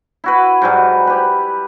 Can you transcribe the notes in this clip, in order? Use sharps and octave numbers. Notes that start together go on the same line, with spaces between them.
E4 F#4 B4
G#2 F#3 G3
G4 B4